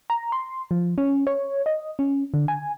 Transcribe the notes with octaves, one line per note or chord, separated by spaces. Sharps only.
A#5
C6
F3
C#4
C#5
D#5
C#4
D3
G#5